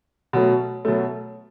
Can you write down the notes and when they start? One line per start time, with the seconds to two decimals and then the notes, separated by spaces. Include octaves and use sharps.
0.33 B2 F#3 A3
0.85 B2 F#3 A3